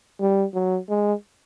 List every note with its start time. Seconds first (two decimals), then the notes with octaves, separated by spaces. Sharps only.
0.20 G3
0.54 F#3
0.89 G#3